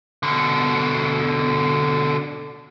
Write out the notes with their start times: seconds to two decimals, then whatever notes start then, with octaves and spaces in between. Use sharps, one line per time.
0.23 B2 D3